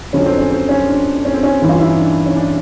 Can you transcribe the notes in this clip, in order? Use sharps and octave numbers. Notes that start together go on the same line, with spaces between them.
F2 D3 F#3 C#4
C4
C#4
C4
C#4
D4
C#4
C4
C#4
G2 E3
F4
E4
D#4
D4
C#4
D4